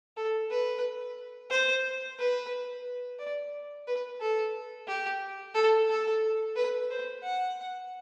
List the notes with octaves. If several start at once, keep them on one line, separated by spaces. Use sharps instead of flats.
A4
B4
C5
B4
D5
B4
A4
G4
A4
A4
B4
C5
F#5